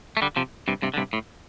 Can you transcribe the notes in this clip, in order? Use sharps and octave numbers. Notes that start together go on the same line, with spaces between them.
A3
D3 G3
C3 F3
G2 C3
G2 C3
D3
G2 C3
A2